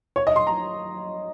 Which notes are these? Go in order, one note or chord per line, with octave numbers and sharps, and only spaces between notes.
C#5
D#5
C6
A#5